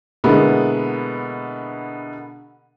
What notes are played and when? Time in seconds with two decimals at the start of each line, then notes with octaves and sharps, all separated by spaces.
0.24 B2 D3 G#3 A#3 B3 E4